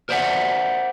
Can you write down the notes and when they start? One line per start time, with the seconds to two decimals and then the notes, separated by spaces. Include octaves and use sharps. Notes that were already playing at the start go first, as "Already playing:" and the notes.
0.09 A#4 C5 D5 E5 F#5